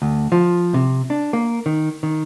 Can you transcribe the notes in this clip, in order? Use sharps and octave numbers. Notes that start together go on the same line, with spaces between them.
D2
F3
C3
D4
A#3
D#3
D#3